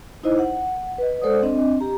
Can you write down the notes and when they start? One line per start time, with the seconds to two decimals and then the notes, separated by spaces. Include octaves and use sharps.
0.23 D#4 E4 C5 D#5
0.39 F#5
0.98 B4 D#5
1.22 G#3 A4 C5 D5 F#5 D#6
1.43 C4 D4 D#5
1.81 G4 A#5